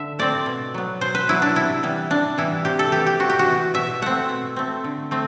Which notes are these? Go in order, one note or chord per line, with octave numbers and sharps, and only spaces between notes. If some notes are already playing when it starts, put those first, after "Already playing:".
Already playing: D3 E5
A3 C4 D5
B2
F#3 B3
B2 C5
B4
F#3 B3 E4
D4
C3 E4
E3 G3 B3
C3 D4
E3 G3 B3 E4
C3 G4
A4
E3 B3 G4
G4
C3 F#4
G4
F#4
E3 B3
B2 E5
A3 C4 F#5
B2
A3 C4
D3
A3 C4